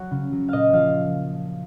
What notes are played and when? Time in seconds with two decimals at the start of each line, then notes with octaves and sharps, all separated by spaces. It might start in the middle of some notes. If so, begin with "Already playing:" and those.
Already playing: F#3 C#5 F#5
0.11 C#3
0.32 F#3
0.48 A#2 D#5 F5
0.73 F3 F5